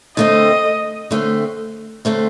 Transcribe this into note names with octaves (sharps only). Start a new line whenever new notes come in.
D3 A3 C4 D#5
D3 A3 C4
D3 A3 C4